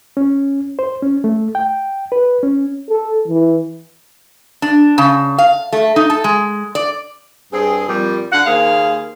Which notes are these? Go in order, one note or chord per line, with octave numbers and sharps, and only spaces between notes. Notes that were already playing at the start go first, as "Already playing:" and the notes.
C#4
C5
C#4
A3
G5
B4
C#4
A4
E3
D4
C#3
F5
A3
D#4
A4
G#3
D5
G2 C4 G#4
F2 A#2 G3
D3 F5 F#5
D#2 A#3 G#4 C5 F5